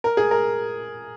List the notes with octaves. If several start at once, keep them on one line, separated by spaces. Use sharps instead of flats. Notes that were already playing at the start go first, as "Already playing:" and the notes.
A#4
G#4
A#4